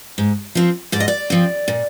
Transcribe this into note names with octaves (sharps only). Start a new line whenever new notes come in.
G#2
F3 C4
G#2 D5
D#5
D5
F3 C4
A#2